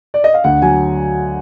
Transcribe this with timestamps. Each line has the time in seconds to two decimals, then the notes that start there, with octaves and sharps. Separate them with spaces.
0.14 D5
0.24 D#5
0.34 F5
0.44 D2 F#5
0.62 F#3 G#5